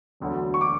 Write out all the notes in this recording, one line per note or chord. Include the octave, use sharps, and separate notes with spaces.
E1 D2 D3 F#3
C#6
D6